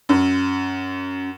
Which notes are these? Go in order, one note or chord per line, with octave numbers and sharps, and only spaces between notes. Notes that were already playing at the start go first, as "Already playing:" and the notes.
F#2